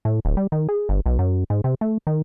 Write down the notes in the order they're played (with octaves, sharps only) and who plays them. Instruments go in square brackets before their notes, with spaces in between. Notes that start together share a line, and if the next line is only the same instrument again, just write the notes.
[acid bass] A2
D1
G3
D#3
G#4
G1
B1
F#2
G#2
C3
A3
D#3